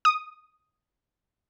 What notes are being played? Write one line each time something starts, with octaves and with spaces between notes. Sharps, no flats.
D#6